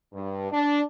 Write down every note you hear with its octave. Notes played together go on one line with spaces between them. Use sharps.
G2
D4